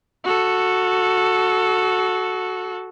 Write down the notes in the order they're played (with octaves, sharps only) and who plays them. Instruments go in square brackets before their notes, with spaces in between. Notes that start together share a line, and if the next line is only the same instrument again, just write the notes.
[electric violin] F#4 A4